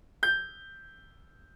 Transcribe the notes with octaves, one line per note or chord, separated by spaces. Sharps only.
G6